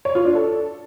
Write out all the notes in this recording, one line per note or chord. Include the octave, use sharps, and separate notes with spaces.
C#5
F4
D4
A4